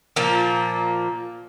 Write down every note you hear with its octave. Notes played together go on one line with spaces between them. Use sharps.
A#2 F3 A#3